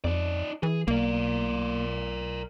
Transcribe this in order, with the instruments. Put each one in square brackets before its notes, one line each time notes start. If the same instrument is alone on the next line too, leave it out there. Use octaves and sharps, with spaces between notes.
[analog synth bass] F2 [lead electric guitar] D#4 D5
[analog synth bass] E3 [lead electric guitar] G#4
[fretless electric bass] B1 [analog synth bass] A#3 [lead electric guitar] A#4 D5